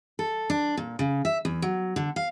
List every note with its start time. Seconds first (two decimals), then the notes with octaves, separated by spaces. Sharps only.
0.19 A4
0.50 D4
0.77 A#2
0.99 C#3
1.25 E5
1.45 E2
1.62 F#3
1.96 D3
2.16 F5